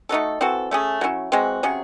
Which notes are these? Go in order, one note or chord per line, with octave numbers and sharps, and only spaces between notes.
A3 D#4 F#4 A4
E3 C4 F#4 A4
A3 C#4 G#4
F#3 C#4 E4
E3 G#3 C4 F#4
C3 F#3 C#4 G#4